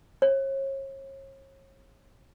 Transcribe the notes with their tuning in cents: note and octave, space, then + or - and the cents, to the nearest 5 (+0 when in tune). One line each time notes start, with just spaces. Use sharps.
C#5 -35